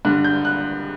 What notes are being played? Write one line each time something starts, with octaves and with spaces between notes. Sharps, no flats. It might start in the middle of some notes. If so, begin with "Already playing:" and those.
G2 D3 F#6
G6
F#6